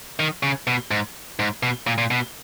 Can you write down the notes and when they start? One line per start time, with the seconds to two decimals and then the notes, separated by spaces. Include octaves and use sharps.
0.19 D#3
0.43 C#3
0.67 B2
0.91 G#2
1.39 G#2
1.63 B2
1.87 A#2
1.98 A#2
2.11 B2